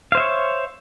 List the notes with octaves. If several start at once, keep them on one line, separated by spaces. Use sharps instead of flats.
C5 C#5 E5 F5